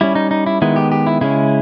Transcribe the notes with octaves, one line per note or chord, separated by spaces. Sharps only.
G3 C#4 E4
D#4
D#4
E4
D#3 G#3 B3 E4
G4
G4
E4
C#3 G#3 C#4 E4